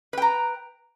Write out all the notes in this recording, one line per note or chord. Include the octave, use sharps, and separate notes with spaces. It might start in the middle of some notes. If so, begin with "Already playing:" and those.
B4 G5 A#5